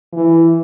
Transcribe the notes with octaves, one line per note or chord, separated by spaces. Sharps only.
E3